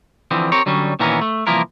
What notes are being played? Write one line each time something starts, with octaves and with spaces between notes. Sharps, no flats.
D3 E3 F3 C4
C4 G4 A#4 C#5
D3 F#3 G3 C#4
A#2 D#3 E3 B3 C#4 A#4
A3
C2 E3 F3 A#3 E4 A#4